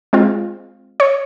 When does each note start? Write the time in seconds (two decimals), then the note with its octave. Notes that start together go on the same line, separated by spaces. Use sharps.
0.13 G#3 C4 F4
1.00 C#5